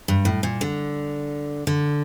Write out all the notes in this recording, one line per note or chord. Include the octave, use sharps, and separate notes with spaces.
G2
A2
A#2
D3
D3